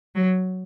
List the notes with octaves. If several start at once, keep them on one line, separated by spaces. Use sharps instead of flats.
F#3